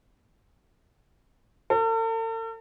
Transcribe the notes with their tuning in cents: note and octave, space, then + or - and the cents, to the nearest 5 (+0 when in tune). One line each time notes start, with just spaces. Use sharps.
A4 +45